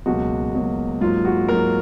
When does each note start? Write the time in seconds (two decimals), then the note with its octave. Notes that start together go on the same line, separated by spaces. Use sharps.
0.06 C#2 B2 F#3 A#3 F#4
0.54 C#2 B2 F#3 A#3
1.01 G#2 F#3 A#3 F4
1.25 F#4
1.48 G#2 F#3 A#3 A#4